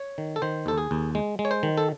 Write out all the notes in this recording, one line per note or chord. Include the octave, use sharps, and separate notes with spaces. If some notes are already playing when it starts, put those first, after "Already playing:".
Already playing: C#5
D#3
A4
D#3 C5
D#2 A4
G#4
D#2
G#3
G#3
C#5
C5
D#3
A4